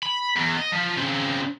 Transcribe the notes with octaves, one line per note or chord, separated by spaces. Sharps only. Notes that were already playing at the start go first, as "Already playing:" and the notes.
B5
E2
D#5
F3
C#3 C4